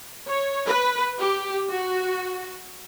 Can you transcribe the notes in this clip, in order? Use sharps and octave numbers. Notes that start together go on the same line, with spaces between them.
C#5
B4
G4
F#4